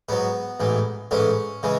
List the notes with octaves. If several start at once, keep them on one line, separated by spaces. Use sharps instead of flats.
G#2 F#3 B3
A1 G#2 E3
A1 G#2 E3 C#4
C#3 E3 G#3